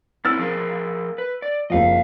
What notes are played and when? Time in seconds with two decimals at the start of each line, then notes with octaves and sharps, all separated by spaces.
0.25 C4 C#4 E4 E6 F6 A6
0.39 F3 G#4 A#4
1.18 B4
1.42 D5
1.70 F#1 F2 D#5 F5